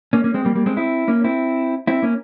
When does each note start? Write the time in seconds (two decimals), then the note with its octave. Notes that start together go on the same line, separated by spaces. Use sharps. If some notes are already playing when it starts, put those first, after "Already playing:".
0.13 A#3 C#4
0.24 A#3 C#4
0.34 G#3 C4
0.45 G3 A#3
0.55 G3 A#3
0.66 G#3 C4
0.77 C4 E4
1.08 A#3 C#4
1.24 C4 E4
1.87 C4 E4
2.02 A#3 C#4